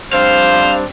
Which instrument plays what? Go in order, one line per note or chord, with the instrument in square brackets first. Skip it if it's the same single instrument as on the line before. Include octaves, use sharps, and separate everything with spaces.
[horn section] G3 C4 D4 [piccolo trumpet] C5 [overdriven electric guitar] F5